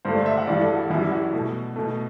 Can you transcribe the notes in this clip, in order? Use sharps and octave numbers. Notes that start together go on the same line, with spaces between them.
G2 D3 A3 C5
D5
E5
F#5
G2 E3 G3 D5
A4
F#4
F#2 E3 G3 E4
F#4
B2 A3
B2 A3